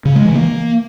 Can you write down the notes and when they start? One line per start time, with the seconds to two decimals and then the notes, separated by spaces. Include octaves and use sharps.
0.05 C#3
0.15 G#3
0.25 E3
0.35 A#3